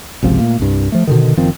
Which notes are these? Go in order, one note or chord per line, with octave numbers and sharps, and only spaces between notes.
G#1 C#2 C3 F3
A#2 A3 A#3
C2 G2
F3 A3
B2 D3 D#3
F#1 D#3 F3 C4